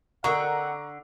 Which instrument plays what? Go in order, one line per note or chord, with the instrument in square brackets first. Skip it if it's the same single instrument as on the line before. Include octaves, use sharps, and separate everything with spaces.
[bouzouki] D3 [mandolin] C4 A#4 D#5 [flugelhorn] F#5 [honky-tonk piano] A#5 C#6